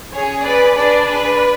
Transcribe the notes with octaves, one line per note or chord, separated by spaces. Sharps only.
C#4 G#4 C#5
B4 D5
D4 G#4 B4 D5
B4 D5